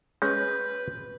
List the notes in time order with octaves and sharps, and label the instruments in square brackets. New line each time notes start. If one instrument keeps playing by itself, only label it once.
[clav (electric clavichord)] G#3 C#4 [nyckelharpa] B4 [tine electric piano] G6